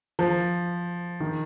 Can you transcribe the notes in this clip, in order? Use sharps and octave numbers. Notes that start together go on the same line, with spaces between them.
F3
D#3